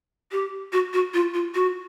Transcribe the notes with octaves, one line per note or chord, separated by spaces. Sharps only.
G4
F#4
F#4
F4
F4
F#4